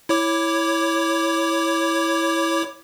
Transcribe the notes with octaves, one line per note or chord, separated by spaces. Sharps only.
E4 C#5 D6